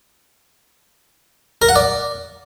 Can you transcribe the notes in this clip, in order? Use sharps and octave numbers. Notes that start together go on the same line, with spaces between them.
A#4
F#5
D5